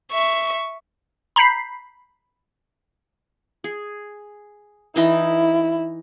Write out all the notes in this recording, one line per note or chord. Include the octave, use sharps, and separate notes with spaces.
E5 C#6
A#5 B5 G6 B6 C7
G#4
E3 D#4 E4 B5